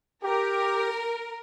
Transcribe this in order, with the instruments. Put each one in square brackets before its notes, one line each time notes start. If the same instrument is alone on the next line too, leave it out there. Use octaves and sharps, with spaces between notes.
[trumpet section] G4 [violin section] A#4